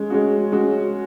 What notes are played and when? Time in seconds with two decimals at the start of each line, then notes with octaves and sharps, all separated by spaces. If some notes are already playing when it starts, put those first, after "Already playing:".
Already playing: G#3 C#4
0.10 G#3 C#4 F#4
0.52 G#3 C#4 F#4